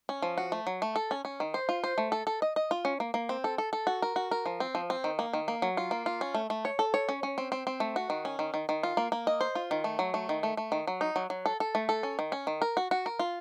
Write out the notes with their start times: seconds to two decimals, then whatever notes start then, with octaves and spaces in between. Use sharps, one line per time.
0.09 C#4
0.22 F3
0.38 F#4
0.52 A3
0.67 F#3
0.82 A3
0.96 A4
1.11 C#4
1.25 C#4
1.40 D#3
1.54 C5
1.69 F4
1.84 C5
1.98 A3
2.12 A4
2.27 A4
2.42 D#5
2.56 D#5
2.71 F4
2.85 C#4
3.00 A#3
3.14 A#3
3.29 C4
3.44 A4
3.58 A4
3.73 A4
3.87 F#4
4.02 A#4
4.16 F#4
4.31 A#4
4.46 F3
4.60 C4
4.75 F3
4.90 C4
5.04 D#3
5.19 A#3
5.33 D#3
5.48 A#3
5.62 F#3
5.77 F4
5.91 A#3
6.06 F4
6.21 C#4
6.34 A3
6.50 A3
6.65 C#5
6.79 A4
6.94 C#5
7.09 C#4
7.23 C#4
7.38 C4
7.52 C4
7.67 C4
7.80 A3
7.96 F#4
8.10 D#3
8.25 C#4
8.39 D#3
8.54 D#3
8.69 D#3
8.83 F4
8.97 A#3
9.12 A#3
9.27 D#5
9.41 C5
9.55 F4
9.71 D#3
9.84 A3
9.99 F#3
10.14 A3
10.29 D#3
10.43 A3
10.57 A3
10.72 D#3
10.87 F#3
11.01 D#4
11.16 F#3
11.30 F#3
11.46 A4
11.60 A4
11.75 A3
11.89 A4
12.03 C#4
12.19 D#3
12.32 C#4
12.47 D#3
12.62 A#4
12.77 F#4
12.91 F#4
13.06 A#4
13.19 F4